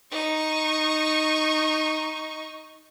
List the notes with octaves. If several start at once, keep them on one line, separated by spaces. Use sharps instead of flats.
D#4 C#6